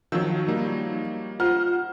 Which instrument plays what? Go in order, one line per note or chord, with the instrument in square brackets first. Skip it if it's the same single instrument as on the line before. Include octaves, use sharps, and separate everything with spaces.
[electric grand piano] D#3 E6 G6 [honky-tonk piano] F3 F#3
[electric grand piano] G3 A#3 D#4
[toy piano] F4 [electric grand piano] C5 F#5 [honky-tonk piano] F6